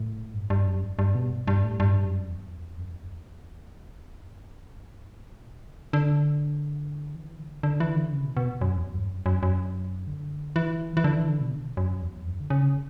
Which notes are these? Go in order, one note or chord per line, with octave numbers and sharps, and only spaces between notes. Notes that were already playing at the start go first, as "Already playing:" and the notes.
Already playing: A2
G2
G2
F#2
G2
B2
G2
A2
G2
F#2
E2
F#2
E2
F#2
E2
G2
F#2
G2
A2
B2
D3
D3
E3
D3
D3
E3
D3
C#3
B2
B2
F#2
E2
G2
F#2
F#2
F#2
D3
E3
E3
D3
E3
D3
B2
F#2
E2
F#2
D3
C#3